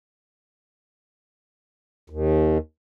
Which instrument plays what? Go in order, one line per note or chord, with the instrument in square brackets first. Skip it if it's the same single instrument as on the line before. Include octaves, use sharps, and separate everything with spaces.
[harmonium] D#2